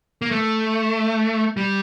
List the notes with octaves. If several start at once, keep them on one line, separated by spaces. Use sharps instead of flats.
A#3
A3
G3